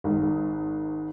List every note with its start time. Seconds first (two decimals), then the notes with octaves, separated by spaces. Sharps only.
0.04 G#1 G#2